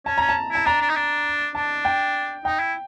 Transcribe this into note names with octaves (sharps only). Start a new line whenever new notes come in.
C#4 A5
C#4 A#5
A5
E4 A5
D4 A#5
D4
D#4
D4
D4 A5
G5
D#4 G5
E4